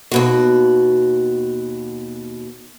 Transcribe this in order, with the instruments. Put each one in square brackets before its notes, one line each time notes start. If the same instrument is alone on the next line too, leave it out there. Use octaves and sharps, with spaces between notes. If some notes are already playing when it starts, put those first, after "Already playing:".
[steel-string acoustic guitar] D#2 B2 F#4